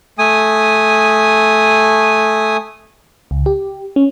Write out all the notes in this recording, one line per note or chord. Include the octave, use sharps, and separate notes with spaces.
A3 G#5 D#6
C#2
G4
C#4